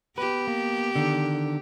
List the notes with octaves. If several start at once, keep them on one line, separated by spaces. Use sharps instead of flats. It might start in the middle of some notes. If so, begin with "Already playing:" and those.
B3 G4 B4
A#3
D3 D#3